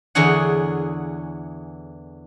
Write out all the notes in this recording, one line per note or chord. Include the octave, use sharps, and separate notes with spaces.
E2 D3 E3 G#4 C#5 F#5